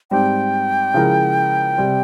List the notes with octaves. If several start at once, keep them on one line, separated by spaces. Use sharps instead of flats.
G#2 G3 C4 G4 G5
C#3 F3 G#3 E4 A#4
C3 G3 C4